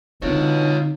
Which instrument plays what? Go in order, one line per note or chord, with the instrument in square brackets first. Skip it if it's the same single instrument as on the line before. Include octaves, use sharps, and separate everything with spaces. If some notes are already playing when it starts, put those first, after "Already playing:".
[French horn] B2 [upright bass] D3 C4 [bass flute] D#4 [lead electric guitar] F4 C#5